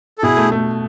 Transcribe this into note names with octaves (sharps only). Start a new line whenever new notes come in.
A4
B2 E4 G#4
A3
A3